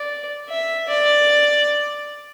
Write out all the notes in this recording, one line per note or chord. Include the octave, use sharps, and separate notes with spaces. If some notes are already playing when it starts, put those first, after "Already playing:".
Already playing: D5
E5
D5